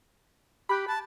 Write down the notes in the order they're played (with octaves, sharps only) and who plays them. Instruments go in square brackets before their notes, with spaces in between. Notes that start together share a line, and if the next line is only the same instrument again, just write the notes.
[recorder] G4 [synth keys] B5 F#6
[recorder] A5